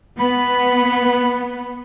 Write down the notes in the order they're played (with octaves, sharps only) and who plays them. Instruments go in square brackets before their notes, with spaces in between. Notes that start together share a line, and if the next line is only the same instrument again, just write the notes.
[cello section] B3 [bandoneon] B5